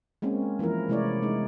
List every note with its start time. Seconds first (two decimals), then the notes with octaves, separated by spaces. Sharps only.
0.22 G#3 A#3 C4 C#4
0.59 E3 F3 A#3 E4 A#4
0.89 C3 G#3 A3 E4 C#5 D5
1.23 G#3 D#4